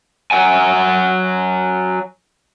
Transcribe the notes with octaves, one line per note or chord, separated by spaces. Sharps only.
F#3 F#5 G#5